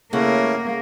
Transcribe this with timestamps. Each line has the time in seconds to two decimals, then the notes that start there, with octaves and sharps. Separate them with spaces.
0.13 C#3 A3 A#3 C#4 E4 F#5